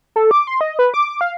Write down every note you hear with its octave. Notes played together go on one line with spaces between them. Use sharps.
A4
D6
C6
D#5
B4
D6
D6
F5